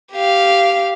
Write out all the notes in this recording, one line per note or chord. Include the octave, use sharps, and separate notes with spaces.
G4 F5